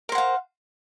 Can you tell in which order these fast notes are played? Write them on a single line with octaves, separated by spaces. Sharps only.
A#4 C5 F#5 F5